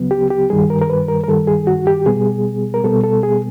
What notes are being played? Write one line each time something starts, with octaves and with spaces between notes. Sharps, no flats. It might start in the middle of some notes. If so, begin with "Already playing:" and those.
Already playing: D2 C#3 F#3 B3
G4
G4
G2 D#3 G3 G#4
A#4
A#4
B4
A#4
A#4
G2 D#3 G3 A4
G#4
F#4
G4
B2 G3 B3 G#4
A#4
B2 G3 B3 A4
A4
G#4